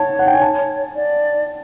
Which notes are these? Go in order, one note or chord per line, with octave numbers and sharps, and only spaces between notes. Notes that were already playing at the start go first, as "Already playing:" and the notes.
Already playing: C#5 A5
F#5
G5
G#5
A5
D5